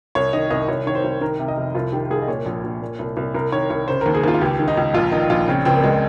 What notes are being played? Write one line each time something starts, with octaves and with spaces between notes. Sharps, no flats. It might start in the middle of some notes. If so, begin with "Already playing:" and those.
C2 C#5
D#3 D#5
C2 D#5
C2 C#5
D#3 C#5
C5
C2
D#3 A#4
C3
D#5
F1
C2 F4
D#3 G4
C2 G#4
D#5
A#2 C#5
A#1
A#1
A#2
C2
C2
C2 A#4
D#3 C#5
C2 C#5
C#3 C5
D#2 A#4
G#4
D#2 F4
F4
C#2 G4
D#3
D#4
C#2
A#1 F4
D#3 D#4
A#1 F4
C#3 C4
C#2 C4
A#3
C#2 G#3